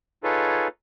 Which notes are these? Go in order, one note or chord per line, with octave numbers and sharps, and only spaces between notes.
D#4 F4 G#4 A4 B4 C#5